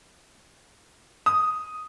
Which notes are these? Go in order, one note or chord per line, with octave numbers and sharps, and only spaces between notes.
D#6